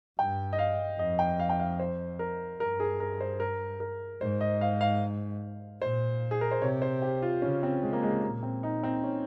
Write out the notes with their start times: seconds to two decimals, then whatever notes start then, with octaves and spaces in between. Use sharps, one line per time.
0.19 G2 G5
0.53 D#5
0.59 F5
0.99 F2 D#5
1.19 G5
1.40 F5
1.49 G5
1.60 F5
1.80 C5
2.19 A#4
2.59 G2 A#4
2.80 G#4
3.00 A#4
3.21 C5
3.40 A#4
3.80 A#4
4.21 G#2 C5
4.41 D#5
4.61 F5
4.81 F5
5.81 A#2 C5
6.31 G#4
6.41 A#4
6.51 C5
6.62 C3 C#5
6.82 C5
7.02 G4
7.22 F4
7.42 C#3 C#4
7.63 C4
7.82 C#3 G#3
7.93 A#3
8.03 G#3
8.23 A#2 A#3
8.43 C4
8.63 D#4
8.83 C4
9.03 C#4